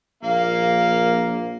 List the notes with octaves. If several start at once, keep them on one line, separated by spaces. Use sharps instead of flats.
A#1 A#3 F5